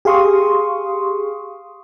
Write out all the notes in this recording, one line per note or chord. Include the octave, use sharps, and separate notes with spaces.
G4 G#4 F5 C6 C#6 D#6